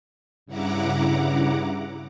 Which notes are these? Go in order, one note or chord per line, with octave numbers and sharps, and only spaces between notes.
G2 C#3 E4 F#5 A#5 D6